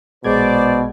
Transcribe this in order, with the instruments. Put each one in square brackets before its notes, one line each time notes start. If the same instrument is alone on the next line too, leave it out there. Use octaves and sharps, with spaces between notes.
[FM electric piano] A#1 G#3 G#6 [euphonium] B2 [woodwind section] C5 D5